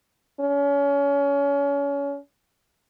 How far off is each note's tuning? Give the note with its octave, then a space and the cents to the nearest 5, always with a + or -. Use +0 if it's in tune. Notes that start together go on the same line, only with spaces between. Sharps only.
C#4 +30